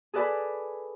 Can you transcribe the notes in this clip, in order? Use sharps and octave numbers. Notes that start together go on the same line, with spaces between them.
G#4 A4 B4 D5 G#5 B5